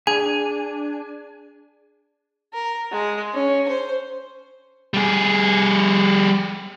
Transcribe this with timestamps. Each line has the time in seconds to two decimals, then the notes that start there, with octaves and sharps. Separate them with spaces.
0.07 D4 G#4 G#5
2.53 A#4
2.91 G#3
3.34 C#4
3.69 C5
4.94 G3 G#4